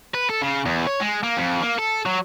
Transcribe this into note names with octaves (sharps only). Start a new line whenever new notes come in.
B4
A4
C#3
E2
C#5
G#3
A#3
F2
A#3
A4
F#3